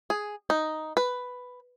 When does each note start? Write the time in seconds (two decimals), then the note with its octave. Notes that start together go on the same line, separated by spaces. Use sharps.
0.10 G#4
0.50 D#4
0.97 B4